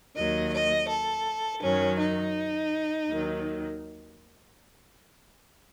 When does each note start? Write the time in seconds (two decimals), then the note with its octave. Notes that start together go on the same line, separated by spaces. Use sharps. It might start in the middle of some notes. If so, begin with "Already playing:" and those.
0.15 D#2 D#3 F#3 D#5
0.52 D#5
0.88 A4
1.62 F#2 D#3 F#3 C#4
1.98 D#4
3.08 D#2 D#3 F#3